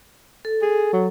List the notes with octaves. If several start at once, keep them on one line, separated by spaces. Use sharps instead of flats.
A4
G#4
F#3